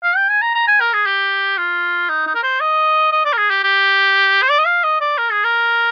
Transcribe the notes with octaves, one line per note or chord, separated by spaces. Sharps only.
F5
G5
G#5
A#5
A#5
G#5
A#4
G#4
G4
F4
D#4
D#4
A#4
C5
D#5
D#5
D5
A#4
G#4
G4
G4
C5
D5
D#5
F5
D#5
D5
A#4
G#4
A#4